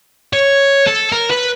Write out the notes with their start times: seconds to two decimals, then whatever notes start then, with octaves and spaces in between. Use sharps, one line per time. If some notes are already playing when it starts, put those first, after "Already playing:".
0.33 C#5
0.87 A4
1.12 A#4
1.30 B4